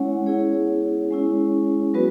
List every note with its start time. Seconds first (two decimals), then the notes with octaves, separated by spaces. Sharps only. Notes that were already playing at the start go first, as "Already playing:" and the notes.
Already playing: G#3 C#4 E4 C#5 F#5
0.26 B3 E4 G#4 C#5
1.10 G#3 C#4 E4
1.94 F#3 B3 F#4 B4